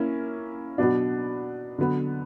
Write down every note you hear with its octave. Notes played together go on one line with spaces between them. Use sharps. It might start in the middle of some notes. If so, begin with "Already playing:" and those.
Already playing: A#3 C#4 E4
B2 F#3 B3 D4
D3 F#3 B3